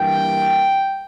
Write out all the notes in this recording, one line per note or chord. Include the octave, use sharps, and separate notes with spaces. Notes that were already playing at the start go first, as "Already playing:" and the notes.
Already playing: G2 E3 A#3 G5